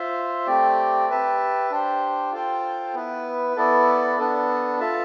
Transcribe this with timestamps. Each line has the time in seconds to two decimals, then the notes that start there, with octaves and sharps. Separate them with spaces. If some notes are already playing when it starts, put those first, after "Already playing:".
Already playing: F4 C5 E5
0.47 A3 C4 G4 D5
1.09 G4 B4 E5 A5
1.70 D4 G4 C5
2.32 F4 A4 C5 G5
2.94 B3 E4 B4
3.56 B3 E4 A4 D5
4.18 B3 D4 A4
4.80 F4 A4 E5 A5